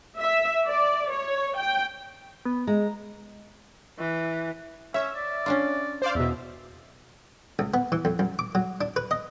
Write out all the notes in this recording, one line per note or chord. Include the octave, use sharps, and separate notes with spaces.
E5
D5
C#5
G5
B3
G#3 A#5
E3
C#4 C#5 E5
D5
C#4 D4 F4
C5 D5 F5
E2 B2 E5
C#2
B3
E3
F2
F#2
D6
F#3
D4
B4
D#5